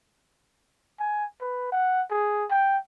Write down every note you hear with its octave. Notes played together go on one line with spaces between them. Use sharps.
G#5
B4
F#5
G#4
G5